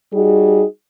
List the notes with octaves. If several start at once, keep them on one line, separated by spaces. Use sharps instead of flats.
G3 D#4 F#4 G#4